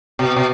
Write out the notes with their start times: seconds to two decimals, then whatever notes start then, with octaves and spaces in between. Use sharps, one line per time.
0.19 B2
0.36 B2